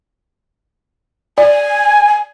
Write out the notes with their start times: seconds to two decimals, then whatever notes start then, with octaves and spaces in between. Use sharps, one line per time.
1.38 D5 G#5